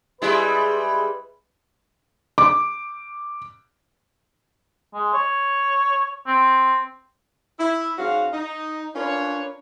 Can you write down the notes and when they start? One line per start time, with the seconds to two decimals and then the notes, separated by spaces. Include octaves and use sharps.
0.22 G3 G#3 E4 B4
2.38 D6
4.94 G#3
5.14 C#5
6.27 C4
7.59 E4
7.98 G#2 C#4 F#4 F5
8.33 D#4
8.95 C#4 D4 F4 A#4 B4 C#5